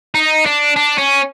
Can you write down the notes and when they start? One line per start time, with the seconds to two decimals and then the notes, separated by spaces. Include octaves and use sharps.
0.14 D#4
0.46 D4
0.76 D4
0.98 C#4